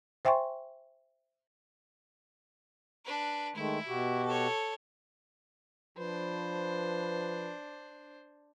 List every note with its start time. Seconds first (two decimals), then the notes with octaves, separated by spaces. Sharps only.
0.25 C5 E5 G5 G#5 C6 C#6
3.05 D4 B4
3.56 D#3 G#3 A3 E4
3.87 B2 F#4 G4
4.25 A4 C#5
5.98 F3 D4 B4 C5